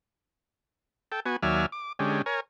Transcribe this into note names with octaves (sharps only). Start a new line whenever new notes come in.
A4 G5
B3 F#4 G#5
D#2 F#3 D5 E5 G#5 F6
D6
D3 G#3 C#4 G4
A#4 C#5 G#5